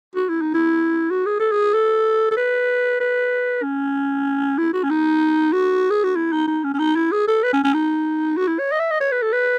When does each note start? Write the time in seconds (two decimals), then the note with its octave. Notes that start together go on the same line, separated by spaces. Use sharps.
0.15 F#4
0.29 E4
0.41 D#4
0.54 E4
1.10 F#4
1.26 G#4
1.39 A4
1.52 G#4
1.74 A4
2.31 A4
2.37 B4
3.00 B4
3.63 C#4
4.58 E4
4.73 F#4
4.83 C#4
4.90 D#4
5.53 F#4
5.90 G#4
6.04 F#4
6.16 E4
6.32 D#4
6.47 D#4
6.64 C#4
6.74 C#4
6.79 D#4
6.96 E4
7.12 G#4
7.27 A4
7.43 B4
7.53 C#4
7.64 C#4
7.74 D#4
8.37 F#4
8.48 E4
8.59 C#5
8.72 D#5
8.79 E5
8.91 D#5
9.01 C#5
9.11 B4
9.22 A4
9.33 B4